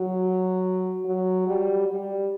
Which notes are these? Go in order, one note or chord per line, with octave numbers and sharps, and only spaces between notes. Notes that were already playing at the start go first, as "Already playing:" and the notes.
Already playing: F#3
F#3
G3
G3